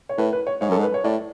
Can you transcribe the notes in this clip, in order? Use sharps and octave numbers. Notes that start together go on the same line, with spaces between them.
C#5
A2 B4
B4
C#5
G#2 C#5
F#2 A4
G#2
B4
C#5
A2 D5